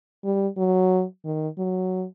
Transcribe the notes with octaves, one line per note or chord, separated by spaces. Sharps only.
G3
F#3
D#3
F#3